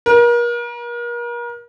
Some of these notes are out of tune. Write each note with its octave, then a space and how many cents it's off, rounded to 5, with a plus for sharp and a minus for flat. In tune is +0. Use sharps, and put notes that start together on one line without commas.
A#4 +40